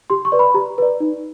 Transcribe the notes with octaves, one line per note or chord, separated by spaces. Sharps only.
G4 C6
C#6
B4 D5
B5
G4 A#5
B4 D5
D#4